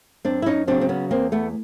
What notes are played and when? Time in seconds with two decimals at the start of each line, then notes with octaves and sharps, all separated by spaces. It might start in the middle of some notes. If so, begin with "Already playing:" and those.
0.24 F#2 C4 D4
0.42 E4
0.46 C#4 D#4
0.67 C#3 F#3 C4 D4
0.81 C4
0.89 B3 C#4
1.11 E2 A#3 C4
1.32 A3 B3